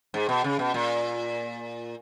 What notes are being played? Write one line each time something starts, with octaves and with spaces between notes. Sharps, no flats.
G#2
B2
C#3
B2
A#2